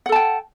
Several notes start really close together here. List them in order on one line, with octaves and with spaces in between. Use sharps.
F#5 A4 A5 G5